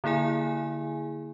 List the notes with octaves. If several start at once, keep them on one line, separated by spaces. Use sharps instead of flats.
D3 A#3 E4 G#4 G#5